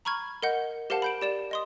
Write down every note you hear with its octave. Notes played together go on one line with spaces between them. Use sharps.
A#5 B5 C#6 F6 G#6
A#4 D#5 F#5 G6
G4 A#4 C5 F5 F#5 A5
B5 G6 D7
G4 D5 E7
D#5 C6 D#6